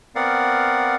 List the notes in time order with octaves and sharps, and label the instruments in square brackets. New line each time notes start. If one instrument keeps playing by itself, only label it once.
[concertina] B3 C4 A#4 D5 F5 F#5